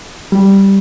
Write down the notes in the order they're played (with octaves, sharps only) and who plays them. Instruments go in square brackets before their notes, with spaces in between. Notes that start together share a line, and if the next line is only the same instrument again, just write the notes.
[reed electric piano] G3